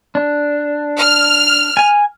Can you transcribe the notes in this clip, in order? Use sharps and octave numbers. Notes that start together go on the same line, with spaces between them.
D4
F6
G#5